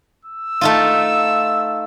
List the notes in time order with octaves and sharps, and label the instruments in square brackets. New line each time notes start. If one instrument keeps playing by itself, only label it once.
[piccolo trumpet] E6
[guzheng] A3 D#4 F4